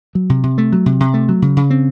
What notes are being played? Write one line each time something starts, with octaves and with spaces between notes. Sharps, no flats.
F#3
C3
C3
A3
F#3
C3
C3
A3
F#3
C#3
C#3
C4